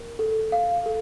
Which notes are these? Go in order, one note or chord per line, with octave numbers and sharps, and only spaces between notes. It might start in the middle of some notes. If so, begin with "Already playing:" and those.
Already playing: A#4
A4
F5
A4